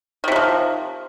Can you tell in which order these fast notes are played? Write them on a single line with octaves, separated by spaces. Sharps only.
D#3 C3 F#3 F3